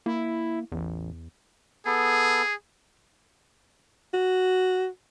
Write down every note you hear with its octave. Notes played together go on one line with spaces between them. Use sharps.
A#3 E4
A1 E2
B3 G#4 A4
F#4